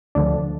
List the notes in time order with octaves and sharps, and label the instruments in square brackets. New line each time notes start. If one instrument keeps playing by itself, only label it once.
[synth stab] D2 D3 F3 D4